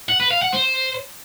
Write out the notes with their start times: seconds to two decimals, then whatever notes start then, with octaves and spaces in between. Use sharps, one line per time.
0.09 F#5
0.20 B4
0.31 F5
0.42 F#5
0.53 C5